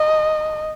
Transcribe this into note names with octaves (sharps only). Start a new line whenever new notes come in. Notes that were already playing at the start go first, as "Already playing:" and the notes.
Already playing: D#5